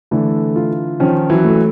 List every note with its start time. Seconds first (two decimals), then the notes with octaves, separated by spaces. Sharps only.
0.11 D3 E3 A3
0.56 F4
1.00 D#3 F3 C#4
1.29 E3 F#3
1.44 A3